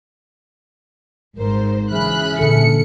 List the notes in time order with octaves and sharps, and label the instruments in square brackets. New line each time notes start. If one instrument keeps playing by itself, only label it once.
[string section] G#1 G#2 C5 [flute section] A#4
[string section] C#3 B5 F#6 [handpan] E3 F#3 [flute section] G#4 E5 F6
[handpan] A#2 D3 A4 [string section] C#7